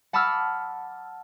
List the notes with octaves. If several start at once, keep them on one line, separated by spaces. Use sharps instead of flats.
F#5 A5 B5 D6 E6 F6